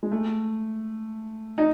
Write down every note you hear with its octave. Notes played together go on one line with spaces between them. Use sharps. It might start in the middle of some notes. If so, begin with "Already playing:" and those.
G#3
A3
D#4